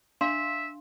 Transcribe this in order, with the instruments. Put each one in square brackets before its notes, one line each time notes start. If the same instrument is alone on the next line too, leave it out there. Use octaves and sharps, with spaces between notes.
[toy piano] D4 F5 C6 [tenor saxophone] E5